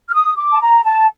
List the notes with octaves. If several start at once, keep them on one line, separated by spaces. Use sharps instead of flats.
F6
D#6
D6
A5
A#5
A5